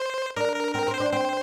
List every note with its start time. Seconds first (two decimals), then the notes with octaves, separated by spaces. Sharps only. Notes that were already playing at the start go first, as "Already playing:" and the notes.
Already playing: C5
0.37 D4 A#4
0.56 A#4
0.75 C4 A#4
0.88 C4
0.94 C5
1.00 D4
1.13 C4 C5